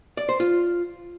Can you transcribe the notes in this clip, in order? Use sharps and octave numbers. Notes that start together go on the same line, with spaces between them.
D5
C5
F4